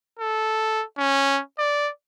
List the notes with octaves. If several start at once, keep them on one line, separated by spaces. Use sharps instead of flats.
A4
C#4
D5